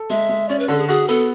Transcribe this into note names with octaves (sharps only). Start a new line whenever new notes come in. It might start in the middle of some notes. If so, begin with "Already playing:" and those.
Already playing: A4
G#3 E5
G#3
C#4 D5
B4
D3 A4
G#4
F#4 G#4
B3 A4